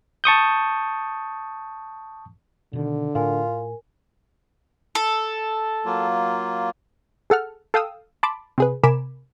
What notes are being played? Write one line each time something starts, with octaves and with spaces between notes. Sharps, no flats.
A5 C#6 D#6 G6
B2 D3 D#3
A2 F4 A#4 G#5
A4
F#3 A#3 F4
G#4 A4 F#5 F6
A4 F5 G5 D#6 E6
A5 B5 C6 D6
C3 G#4 B4
C3 A#4 G#5 B5 D6 E7